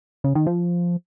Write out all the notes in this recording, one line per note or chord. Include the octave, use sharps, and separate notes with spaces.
C#3
D#3
F3